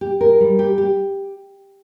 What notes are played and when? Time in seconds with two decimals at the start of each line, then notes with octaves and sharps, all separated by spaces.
0.01 G4
0.21 A#4
0.40 G3
0.59 G4
0.78 G4